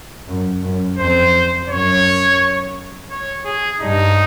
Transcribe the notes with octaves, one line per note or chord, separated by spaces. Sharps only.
F#2
F#2
F2 C5
F#2 C#5
C#5
G#4
G2 D#4